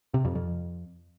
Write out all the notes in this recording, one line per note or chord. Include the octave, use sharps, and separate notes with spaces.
C3
F2
F2